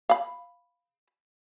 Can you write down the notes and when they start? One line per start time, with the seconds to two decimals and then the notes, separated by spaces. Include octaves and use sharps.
0.09 F5 B5